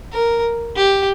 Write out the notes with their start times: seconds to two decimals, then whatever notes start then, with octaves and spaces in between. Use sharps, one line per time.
0.13 A#4
0.76 G4